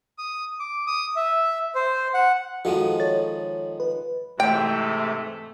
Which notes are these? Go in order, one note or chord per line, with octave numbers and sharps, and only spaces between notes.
D#6
D6
D#6
E5
C5
F#5
D#3 F3 G#3 F#4 A4
A4 C#5 A6
B4
G#2 C3 E3 A3 G5